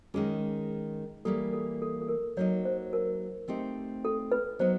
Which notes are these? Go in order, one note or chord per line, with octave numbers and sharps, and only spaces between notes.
D#3 G#3 C#4 G#4
E3 G3 A#3 A4
A4
A4
A4
A#4
F#3 A#3 D#4 C#5
C5
A#4
A3 C4 D#4 G4 C5
A4
B4
F#3 B3 D#4 C5